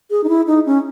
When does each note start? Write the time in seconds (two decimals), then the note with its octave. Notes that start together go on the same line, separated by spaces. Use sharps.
0.11 G#4
0.24 D#4
0.29 E4
0.47 D#4
0.66 C#4